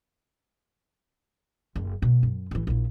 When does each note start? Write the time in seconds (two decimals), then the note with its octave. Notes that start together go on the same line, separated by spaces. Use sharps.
1.76 F#1
2.02 B2 A3
2.23 F#2
2.51 A1 E3
2.67 A#1 E4